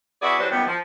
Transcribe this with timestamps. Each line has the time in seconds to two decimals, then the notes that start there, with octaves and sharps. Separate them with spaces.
0.22 B3 E4 F#4 G#4 D5 E5
0.39 E3 F#3 G3 D4 B4 C5
0.51 F#2 A#2 D#3 G3 B3
0.67 F3